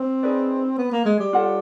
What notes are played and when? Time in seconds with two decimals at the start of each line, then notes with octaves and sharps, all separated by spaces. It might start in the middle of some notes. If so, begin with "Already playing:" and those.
Already playing: C4
0.23 D#4 G#4 B4 D5
0.78 B3
0.92 A#3
1.05 G#3
1.19 G3
1.33 F4 A4 C#5 F#5